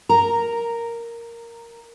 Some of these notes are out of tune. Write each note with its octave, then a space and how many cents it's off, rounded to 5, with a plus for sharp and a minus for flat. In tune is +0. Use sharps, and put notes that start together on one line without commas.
A#4 +0 A#5 -10